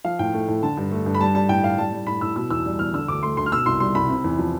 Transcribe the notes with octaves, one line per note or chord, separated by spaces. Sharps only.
F3 F5
A2 G5
A3
A2
D3 A5
G2
A3
G2
B5
G3 A5
G3 A5
A2 G5
A2 F5
G3 A5
G3
A2 B5
A2 E6
B2 E6
E2 E6
G3
E2 F6
D3 E6
D2 D6
A3 C6
D2 C6
F6
B2 E6
C2 C6
G3 C6
C2 B5
C3
E2
F3